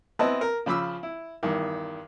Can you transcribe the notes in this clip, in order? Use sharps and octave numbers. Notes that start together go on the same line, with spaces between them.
B3 C4 E4 B4 D#5 A5
A#4
C#3 F3 B5 D6 E6
E4
E2 G2 D#3